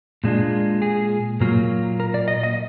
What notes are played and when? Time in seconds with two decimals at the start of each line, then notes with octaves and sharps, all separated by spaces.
0.24 A#2 G#3 D4 F4
0.82 G#4
1.40 A#2 F#3 A#3 F4
2.00 A#4
2.14 D5
2.28 D#5
2.43 D#5